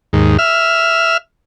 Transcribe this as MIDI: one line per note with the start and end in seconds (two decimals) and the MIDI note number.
0.13 0.37 39
0.13 0.37 44
0.38 1.17 76
0.38 1.17 89